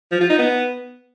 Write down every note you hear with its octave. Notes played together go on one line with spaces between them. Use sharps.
F3
F4
D#4
B3